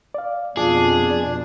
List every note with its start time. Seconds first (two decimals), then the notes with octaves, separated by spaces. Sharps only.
0.14 D5 F5
0.57 F2 B2 D4 F4 G#4 A5 D6
1.11 D5